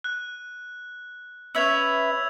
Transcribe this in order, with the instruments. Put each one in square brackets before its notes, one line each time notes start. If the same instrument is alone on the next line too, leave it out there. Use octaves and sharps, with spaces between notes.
[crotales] F#6
[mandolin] C#4 B4 E5 [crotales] E6 G#6 F7